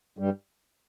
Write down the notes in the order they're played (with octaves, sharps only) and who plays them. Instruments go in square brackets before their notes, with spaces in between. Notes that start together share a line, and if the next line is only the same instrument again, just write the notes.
[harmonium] G2 G3